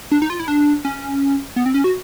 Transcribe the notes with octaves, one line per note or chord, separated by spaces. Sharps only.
D4
D#4
F4
E4
D4
C#4
B3
C4
C#4
F#4